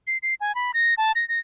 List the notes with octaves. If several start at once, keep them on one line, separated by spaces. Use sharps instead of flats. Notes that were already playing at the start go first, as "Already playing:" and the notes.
C7
C7
G#5
B5
A#6
A5
A#6
A#6